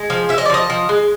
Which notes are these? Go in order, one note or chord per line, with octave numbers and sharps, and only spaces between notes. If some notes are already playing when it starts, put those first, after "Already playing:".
Already playing: G#3
F3
F3 E5
D#5
D5
F3 D#5
F3
G#3